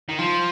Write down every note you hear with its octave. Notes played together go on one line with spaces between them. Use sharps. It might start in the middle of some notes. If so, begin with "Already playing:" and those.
D#3
F3